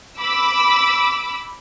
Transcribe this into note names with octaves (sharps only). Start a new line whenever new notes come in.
B5 D6 E6